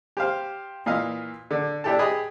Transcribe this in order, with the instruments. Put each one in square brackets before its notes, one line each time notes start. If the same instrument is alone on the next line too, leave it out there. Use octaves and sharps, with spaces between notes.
[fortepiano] G4 C5 F5
A#2 E3 D#5 F5 D#6
D3
D4 E4 G4 A4 A5
G4 G#4 D#5 B5